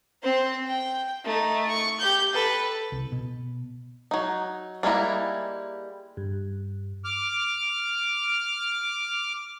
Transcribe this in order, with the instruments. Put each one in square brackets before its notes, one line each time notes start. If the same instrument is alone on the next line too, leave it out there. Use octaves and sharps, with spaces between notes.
[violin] C4 C5
G5
A3 D#4
C#6
G4 G6
A4 B4
[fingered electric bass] C2
B2
[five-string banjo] F#3 D#4
G3 G#3 A#3 E4 A#5
[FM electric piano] G2
[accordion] D6 F6